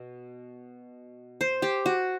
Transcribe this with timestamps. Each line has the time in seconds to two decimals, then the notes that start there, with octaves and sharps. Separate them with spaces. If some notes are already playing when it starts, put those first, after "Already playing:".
Already playing: B2
1.41 C5
1.62 G4
1.86 F#4